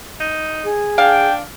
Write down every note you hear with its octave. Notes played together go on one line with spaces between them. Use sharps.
D#4
G#4
D4 F5 G5